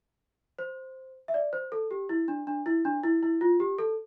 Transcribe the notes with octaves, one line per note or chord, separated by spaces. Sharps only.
C5
E5
D5
C5
A4
G4
E4
D4
D4
E4
D4
E4
E4
F4
G4
A4